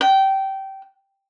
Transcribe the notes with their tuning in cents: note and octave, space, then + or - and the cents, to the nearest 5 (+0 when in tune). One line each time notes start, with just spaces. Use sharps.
G5 -20